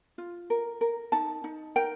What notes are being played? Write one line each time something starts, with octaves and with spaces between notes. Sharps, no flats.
F4
A#4
A#4
D#4 A5
D#4
A#4 G5